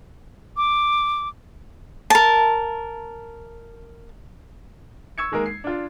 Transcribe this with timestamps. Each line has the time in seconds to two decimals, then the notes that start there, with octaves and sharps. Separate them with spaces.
0.57 D6
2.10 A#4 A5
5.18 C#6 E6 G#6 C#7
5.32 D#3 G#3 A#3 A#4
5.46 C7
5.64 D4 F4